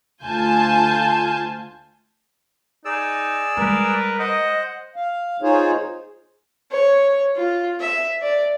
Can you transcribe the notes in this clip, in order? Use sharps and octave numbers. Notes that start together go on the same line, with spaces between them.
D2 F4 G#5 A5 G6
D#4 G#4 D5 E6
G3 G#3 A#4 B4
C5 D#5 F#5
F5
D#4 F4 G#4 C5 C#5
C#5
F4
E5
D5